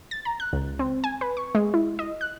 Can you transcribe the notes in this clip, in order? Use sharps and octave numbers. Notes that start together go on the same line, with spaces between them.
A6
A#5
F#6
C#2
C4
G#5
B4
C#6
G#3
E4
D#5
F#6